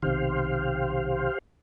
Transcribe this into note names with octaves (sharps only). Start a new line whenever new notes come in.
B1 C3 D#3 G4 C5 F5